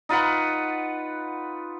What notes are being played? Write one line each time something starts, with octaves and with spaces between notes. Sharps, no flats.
D#4 F4 B4 F#5